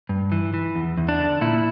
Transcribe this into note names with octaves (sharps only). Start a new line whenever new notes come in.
G2
E3
E3
E2
E2
D4
D3
A#2 E4